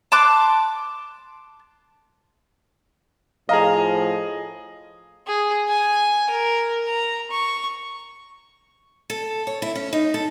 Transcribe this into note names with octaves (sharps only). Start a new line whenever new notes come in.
A5 C6 D6 F#6
A2 F3 G#4 D#5 F5 A#5
G#4
G#5
A#4
A#5
C#6
A4
C#5
E4
C#4
D#4
A4